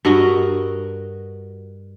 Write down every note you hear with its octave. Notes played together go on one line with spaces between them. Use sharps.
G2 F#4 A#4 D#5